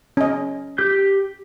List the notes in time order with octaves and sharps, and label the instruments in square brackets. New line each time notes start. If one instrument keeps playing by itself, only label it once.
[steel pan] C#4 D#5
[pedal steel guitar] G4 G6